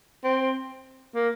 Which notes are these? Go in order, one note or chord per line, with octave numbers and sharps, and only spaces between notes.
C4
A#3